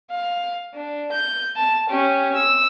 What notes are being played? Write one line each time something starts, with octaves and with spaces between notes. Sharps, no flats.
F5
D4
G6
A5
C#4 G4
E6